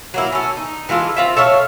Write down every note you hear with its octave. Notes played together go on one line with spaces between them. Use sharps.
F#3 A#3 E4
C#4 A4
D#4
E3 G#3 F4 A4
C4 F4 E5
A4 C#5 E5 F5